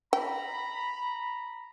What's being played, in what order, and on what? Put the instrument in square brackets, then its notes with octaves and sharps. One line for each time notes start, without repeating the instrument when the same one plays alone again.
[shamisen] G5 [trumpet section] A#5 B5